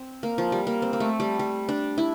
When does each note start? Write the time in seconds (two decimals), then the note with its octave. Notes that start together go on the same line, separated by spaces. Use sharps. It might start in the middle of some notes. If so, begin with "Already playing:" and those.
Already playing: C4
0.23 A#3
0.38 F3
0.52 G3
0.67 A#3
0.82 C4
0.93 A#3
1.00 A3
1.20 G3
1.39 G3
1.69 D4
1.98 E4